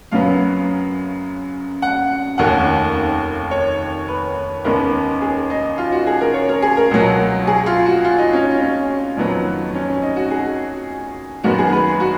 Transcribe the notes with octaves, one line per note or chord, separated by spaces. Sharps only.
F#2 C#3 F#3 B3 F5
F#5
F1 D#2 D#3 A#3 C#4 F#5
C#5
B4
D#2 C#3 G#3 B3 A#4
G#4
D#4
F4
F#4
G#4
A#4
C#5
A#4
G#4
A#4
C#2 B2 F#3 F#4
G#4
F4
F#4
F4
D#4
C#4
C#4
F2 D#3 F#3 B3
C#4
C#4
D#4
F#4
G#4
F#2 D#3 G#3 B3 F#4
G#4
B4
F#4